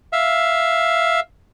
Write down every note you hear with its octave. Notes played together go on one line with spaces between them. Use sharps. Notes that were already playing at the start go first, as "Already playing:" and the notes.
E5 F5